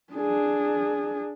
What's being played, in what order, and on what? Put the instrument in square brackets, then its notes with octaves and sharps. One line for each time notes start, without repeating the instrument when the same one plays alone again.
[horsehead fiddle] D4 G#4